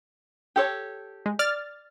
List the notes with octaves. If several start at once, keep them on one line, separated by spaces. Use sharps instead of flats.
G4 A4 C#5
G#3
D5 F6 A6